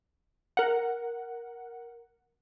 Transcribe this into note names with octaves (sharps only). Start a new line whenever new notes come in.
A#4 F#5